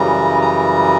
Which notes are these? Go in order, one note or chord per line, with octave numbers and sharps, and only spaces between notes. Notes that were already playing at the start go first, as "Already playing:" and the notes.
Already playing: F#2 C#3 E3 G3 A#5
A#5